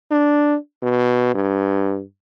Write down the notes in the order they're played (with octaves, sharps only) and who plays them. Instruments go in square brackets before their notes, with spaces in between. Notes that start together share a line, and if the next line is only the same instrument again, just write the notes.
[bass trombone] D4
B2
G2